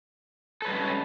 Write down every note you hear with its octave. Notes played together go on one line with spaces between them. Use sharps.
G3 G#3 C#4 A4 B4